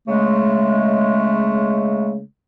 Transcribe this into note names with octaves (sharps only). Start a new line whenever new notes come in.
C#3 G#3 A3